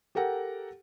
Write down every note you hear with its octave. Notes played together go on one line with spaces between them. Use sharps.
G4 A4 A#4 F#5 G5